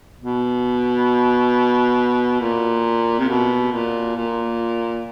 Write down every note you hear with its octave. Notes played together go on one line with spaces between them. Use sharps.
B2
A#2
C3
B2
A#2
A#2